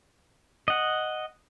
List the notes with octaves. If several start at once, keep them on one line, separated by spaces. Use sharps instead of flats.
D#5 F#5